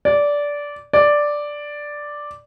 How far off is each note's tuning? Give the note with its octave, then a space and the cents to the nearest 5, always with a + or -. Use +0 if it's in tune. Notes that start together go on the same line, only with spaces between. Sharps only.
D5 -15
D5 +0